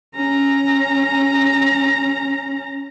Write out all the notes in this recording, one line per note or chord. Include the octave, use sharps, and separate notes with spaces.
C#4 A#5